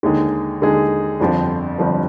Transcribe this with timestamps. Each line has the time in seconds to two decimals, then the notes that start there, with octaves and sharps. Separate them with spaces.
0.03 D#2 D3 G#3 D#4 G#4
0.61 D#2 D3 G#3 D#4 G#4
1.20 G1 F2 D3 F3 C4
1.78 G1 F2 D3 F3 C4